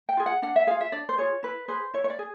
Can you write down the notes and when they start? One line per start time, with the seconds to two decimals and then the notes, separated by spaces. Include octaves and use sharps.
0.09 G5
0.17 F4 G#4
0.26 F#5
0.42 D4 F#5
0.56 E5
0.67 F4 G#4 F5
0.81 E5
0.92 D4 D5
1.09 C5
1.18 F4 G#4 C#5
1.43 E4 B4
1.68 G#4 B4 C5
1.94 E4 C#5
2.04 C#5
2.10 D5
2.19 G#4